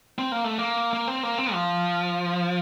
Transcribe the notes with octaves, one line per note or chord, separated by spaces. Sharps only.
C4
A#3
A3
A#3
A#3
C4
A#3
C4
F3